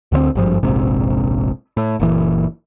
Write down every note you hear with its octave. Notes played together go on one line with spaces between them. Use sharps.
D2 D3 D#3 C4
G#1 G2 F3
F1 A#1 G#2 C3
A2
F#1 A#2 E3